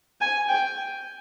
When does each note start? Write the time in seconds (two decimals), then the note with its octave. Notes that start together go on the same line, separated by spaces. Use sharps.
0.21 G#5
0.48 G5